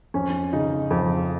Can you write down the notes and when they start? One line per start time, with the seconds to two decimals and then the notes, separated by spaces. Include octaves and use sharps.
0.14 F2 C#4
0.53 C#3 D#4
0.90 F2